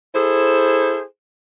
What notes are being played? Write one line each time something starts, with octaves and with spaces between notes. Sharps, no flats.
E4 G#4 A4 C5